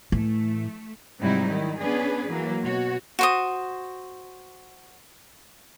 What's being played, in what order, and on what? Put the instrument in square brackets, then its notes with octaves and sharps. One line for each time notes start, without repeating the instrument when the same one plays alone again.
[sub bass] A2 [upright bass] E3 [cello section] A3
[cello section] G#2 C3 F#3 G3 D#4 E4
D#3 E4
B3 C#4 D4 G#4 B4
E3 F#3 A#3
B2 F#4 C#5
[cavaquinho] F#4 C5 D#6